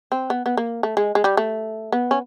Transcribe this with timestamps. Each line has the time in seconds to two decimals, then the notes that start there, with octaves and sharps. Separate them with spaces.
0.12 C4
0.30 B3
0.46 B3
0.57 A#3
0.83 A3
0.97 G#3
1.15 G#3
1.24 G3
1.37 A3
1.92 B3
2.11 C#4